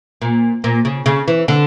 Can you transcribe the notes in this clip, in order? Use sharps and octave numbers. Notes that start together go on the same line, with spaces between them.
A#2
A#2
C#3
C#3
E3
D3